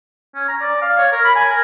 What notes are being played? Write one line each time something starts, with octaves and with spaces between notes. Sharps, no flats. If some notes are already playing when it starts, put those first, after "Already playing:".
C#4
A#5
D5
F5
C#5
A#4
B5
G#5
A#4